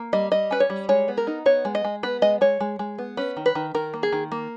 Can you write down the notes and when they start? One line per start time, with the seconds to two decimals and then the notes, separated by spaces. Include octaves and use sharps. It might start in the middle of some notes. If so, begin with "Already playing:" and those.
Already playing: A#3
0.13 G3 D#5
0.32 G3 D#5
0.51 C#4 B4
0.60 C#5
0.70 G3
0.89 G#3 C#5
1.08 B3
1.17 A#4
1.27 D#4
1.46 B3 C#5
1.65 G#3
1.75 D#5
1.84 G#3
2.03 B3 B4
2.22 G#3 D#5
2.41 G#3 C#5
2.60 G#3
2.79 G#3
2.98 B3
3.17 C#4 B4
3.37 D#3
3.46 B4
3.55 D#3
3.75 D#3 A#4
3.94 A#3
4.03 G#4
4.12 D#3
4.32 A#3